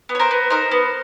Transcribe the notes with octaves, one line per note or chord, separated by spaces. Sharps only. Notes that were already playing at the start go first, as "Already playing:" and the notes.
B3
C#5
A#4 C5
B3
D#4 A#4 C5
B3